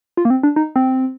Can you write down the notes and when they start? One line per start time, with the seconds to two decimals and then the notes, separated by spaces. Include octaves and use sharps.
0.17 F4
0.25 A#3
0.30 C4
0.43 D4
0.56 D#4
0.76 C4